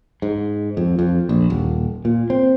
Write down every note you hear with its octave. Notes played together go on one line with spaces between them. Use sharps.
G#2
F2
F2
A#1
D#1
A#2
C4